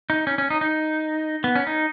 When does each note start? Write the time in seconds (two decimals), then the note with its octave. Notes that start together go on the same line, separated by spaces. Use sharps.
0.10 D#4
0.27 C#4
0.38 C#4
0.50 D#4
0.61 D#4
1.44 B3
1.56 C#4
1.67 D#4